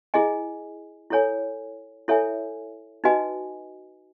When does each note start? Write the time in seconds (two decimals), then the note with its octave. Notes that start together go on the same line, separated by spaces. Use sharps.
0.14 E4 G#4 D#5 G#5
1.10 E4 A4 C#5 G#5
2.08 E4 A4 C#5 E5 G#5
3.04 D#4 F#4 B4 D#5 G#5